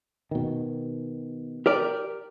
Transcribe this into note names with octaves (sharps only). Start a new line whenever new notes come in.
B2 D#3
G4 A#4 D5